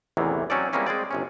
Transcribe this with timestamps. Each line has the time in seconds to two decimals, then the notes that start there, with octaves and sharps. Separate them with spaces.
0.17 A1 E2 C3 D#3 E3
0.50 F#3 C4 C#4 D#4 A4 D5
0.73 G3 G#3 A#3 C4 C#4 E4
0.87 G#3 C4 G#4 D5
1.11 G1 C3 C#4